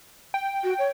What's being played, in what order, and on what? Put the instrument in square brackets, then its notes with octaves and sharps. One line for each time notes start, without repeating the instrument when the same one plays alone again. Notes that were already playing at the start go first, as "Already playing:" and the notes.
[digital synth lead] G5
[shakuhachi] F#4
C#5